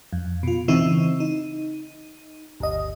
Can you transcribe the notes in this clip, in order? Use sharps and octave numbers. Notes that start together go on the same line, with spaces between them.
F2
B2 F4
C#3 E3 C4 D#4 E4
D#4
G1 D2 D#5